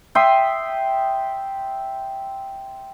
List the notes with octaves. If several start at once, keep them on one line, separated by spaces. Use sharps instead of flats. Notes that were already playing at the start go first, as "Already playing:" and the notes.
E5 G5 C6 D#6